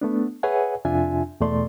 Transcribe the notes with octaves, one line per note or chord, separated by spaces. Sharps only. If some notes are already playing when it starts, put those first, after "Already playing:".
A3 B3 D4
G#4 B4 C#5 E5 F#5 G#5
F2 C3 D4 F4 E5 G#5
E2 B2 A3 D5 C6